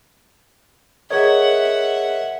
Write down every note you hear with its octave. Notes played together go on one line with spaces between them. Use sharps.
G#4 A#4 C#5 D#5 E5 F#5 G#6